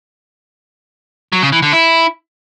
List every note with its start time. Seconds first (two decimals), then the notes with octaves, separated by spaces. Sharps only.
1.32 F#3
1.42 C#3
1.52 E3
1.62 D3
1.72 E4